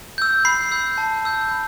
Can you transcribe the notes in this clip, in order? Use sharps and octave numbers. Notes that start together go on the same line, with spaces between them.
E6 G6
B5 C7
E6 G6
A5
E6 G6
B5